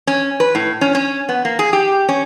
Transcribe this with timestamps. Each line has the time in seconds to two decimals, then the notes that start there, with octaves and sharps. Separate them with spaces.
0.07 C#4
0.40 B4
0.55 A2
0.81 C#4
0.95 C#4
1.29 B3
1.45 A#3
1.59 G#4
1.73 G4
2.09 C#4